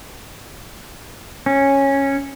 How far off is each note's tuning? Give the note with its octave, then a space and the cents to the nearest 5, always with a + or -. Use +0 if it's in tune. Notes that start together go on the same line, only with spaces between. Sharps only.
C#4 -10